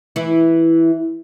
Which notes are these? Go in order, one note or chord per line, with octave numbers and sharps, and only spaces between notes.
E3 E4